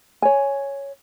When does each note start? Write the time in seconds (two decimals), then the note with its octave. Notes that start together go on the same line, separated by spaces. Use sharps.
0.22 C#5 G#5